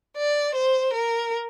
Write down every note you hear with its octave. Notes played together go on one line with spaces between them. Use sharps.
D5
C5
A#4